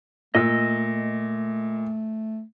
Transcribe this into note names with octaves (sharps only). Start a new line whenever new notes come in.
A#2 A3 D#5 E6